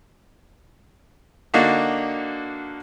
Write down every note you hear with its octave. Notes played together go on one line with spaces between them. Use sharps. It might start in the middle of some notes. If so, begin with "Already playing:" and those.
D3 A#3 D4 D#4 F#4